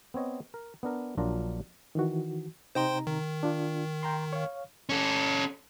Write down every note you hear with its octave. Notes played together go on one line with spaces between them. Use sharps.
B3 C4 C#5 D#5
A#4
B3 D4 A#4
A#1 F#3 D4 F4 A#4 A#5
D#3 E3 F#4
C3 D#4 C5 G5 A#5 C6
D#3
D4 F4
G5 A#5 C6
C#5 F5
C#4 A4